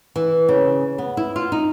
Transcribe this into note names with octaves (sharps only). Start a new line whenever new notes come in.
E3
C#3
B3
E4
F4
D#4